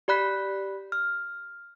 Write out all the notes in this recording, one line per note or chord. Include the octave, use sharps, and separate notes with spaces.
G4 D5 B5 F#6 B6
F6